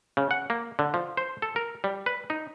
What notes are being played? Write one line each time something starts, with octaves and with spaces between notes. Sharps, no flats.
C#3
F#5
A#3
D3
F3
C5
A4
A#4
G3
B4
D#4